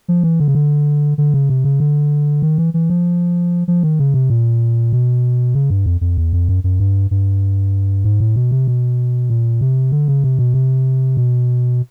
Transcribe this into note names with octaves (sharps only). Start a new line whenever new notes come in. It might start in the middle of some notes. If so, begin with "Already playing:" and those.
F3
E3
D3
C#3
D3
D3
C#3
C3
C#3
D3
D#3
E3
E3
F3
F3
D#3
C#3
C3
A#2
B2
C#3
G2
F2
F2
E2
F2
F#2
F#2
G2
G2
G#2
A2
B2
C3
B2
A#2
C3
D3
C#3
C3
B2
C3
B2